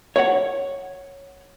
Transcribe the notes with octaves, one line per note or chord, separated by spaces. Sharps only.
C#5 F#5